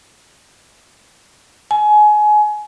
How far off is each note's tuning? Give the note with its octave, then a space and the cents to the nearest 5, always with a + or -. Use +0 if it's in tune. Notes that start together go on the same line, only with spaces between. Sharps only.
G#5 +25